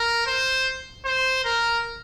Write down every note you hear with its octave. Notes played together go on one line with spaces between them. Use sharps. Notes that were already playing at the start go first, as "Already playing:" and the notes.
Already playing: A#4
C5
C5
A#4